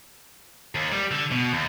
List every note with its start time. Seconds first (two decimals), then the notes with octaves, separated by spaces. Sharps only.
0.75 D#2
0.92 G3
1.11 D3
1.31 B2
1.53 D#2